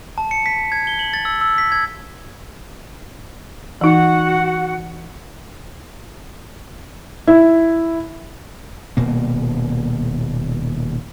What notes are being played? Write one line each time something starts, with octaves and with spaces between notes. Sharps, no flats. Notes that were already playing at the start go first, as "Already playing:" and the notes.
A5
C#7
B6
G#6
G7
F#7
A6
E6
E6
B6
G#6
E3 D#4 F#4 F#5
E4
D#1 B2 A#3